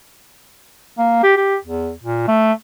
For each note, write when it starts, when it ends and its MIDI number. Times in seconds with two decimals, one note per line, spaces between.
0.98 1.20 58
1.23 1.33 67
1.37 1.56 67
1.65 1.91 40
2.03 2.26 46
2.28 2.53 57